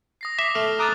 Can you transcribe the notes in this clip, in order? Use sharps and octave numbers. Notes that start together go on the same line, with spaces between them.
D#6 A#6 C7
E5 D6 C7
A3 F6
A#5 D6 D#6 F#6 A6